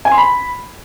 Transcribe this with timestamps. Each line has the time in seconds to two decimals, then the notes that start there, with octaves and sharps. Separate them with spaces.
0.05 G#5
0.11 C6
0.18 B5